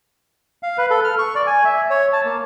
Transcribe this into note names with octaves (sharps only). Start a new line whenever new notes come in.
F5
B4
A4
F6
C#6
D5
G#5
E5
C#5
A5
A#3